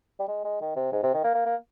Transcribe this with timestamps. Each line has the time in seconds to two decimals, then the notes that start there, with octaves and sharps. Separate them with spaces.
0.20 G3
0.28 G#3
0.45 G#3
0.61 D#3
0.76 C3
0.93 G#2
1.03 C3
1.14 D#3
1.24 A#3
1.35 A#3
1.46 A#3